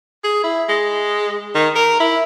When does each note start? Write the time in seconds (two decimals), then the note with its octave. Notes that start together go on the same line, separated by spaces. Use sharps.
0.24 G#4
0.44 E4
0.69 G#3
1.54 D#3
1.76 A#4
2.00 E4